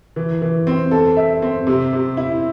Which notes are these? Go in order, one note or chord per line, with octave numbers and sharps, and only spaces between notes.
E3
E3
C4
A4
E5
C4
C3
C3
E4